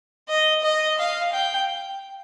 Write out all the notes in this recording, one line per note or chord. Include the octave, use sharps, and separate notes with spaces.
D#5
D#5
F5
G5